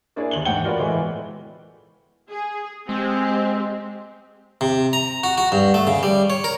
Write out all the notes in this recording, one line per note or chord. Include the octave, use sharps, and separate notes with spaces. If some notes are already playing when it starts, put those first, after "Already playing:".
A#3 D4 E4 G#4 C#5 D5
D#2 F#7 G7
E2 G#2 F#5 G5 G7
F4 F#4 A#4 B4 D5
A2 E3 G#3 A3 B3
G#4
G#3 C4 G4
C3
A#5
F#4
F#4
G2
A3
C#3
G3
C#5
A#4